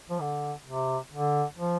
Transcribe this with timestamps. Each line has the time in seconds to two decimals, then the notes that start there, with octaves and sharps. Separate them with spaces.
0.10 F3
0.21 D3
0.66 C3
1.12 D3
1.57 F3